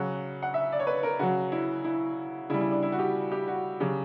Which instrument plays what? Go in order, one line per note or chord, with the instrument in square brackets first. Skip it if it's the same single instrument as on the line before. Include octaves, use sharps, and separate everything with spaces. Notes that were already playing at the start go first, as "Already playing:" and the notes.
Already playing: [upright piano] C#3 F#3 F#5
F#5
E5
D5
C#5
B4
A#4
C#3 F#3 F#4
E4
E4
C#3 E4
G3
E4
D4
E4
F#4
G4
G4
F#4
C#3 F#3 G4